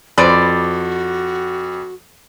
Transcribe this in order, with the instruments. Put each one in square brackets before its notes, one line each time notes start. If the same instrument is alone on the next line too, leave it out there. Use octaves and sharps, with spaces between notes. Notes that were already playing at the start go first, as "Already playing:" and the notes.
[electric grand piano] F2 [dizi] F#4 [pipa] B4 C5 D5